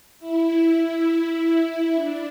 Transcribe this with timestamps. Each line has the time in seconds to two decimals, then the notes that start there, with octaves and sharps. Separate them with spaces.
0.19 E4
1.95 D4